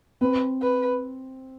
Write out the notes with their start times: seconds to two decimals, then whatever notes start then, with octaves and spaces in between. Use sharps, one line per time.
0.21 C4 B4
0.62 B4